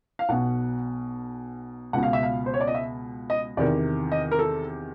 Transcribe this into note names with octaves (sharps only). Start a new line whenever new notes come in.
F5
B1 B2 F#5
C#2 B2 F#5
F5
E5
F5
C5
C#5
D5
D#5
E5
D#5
E2 C3 D#3 D5
D#5
A#4
A4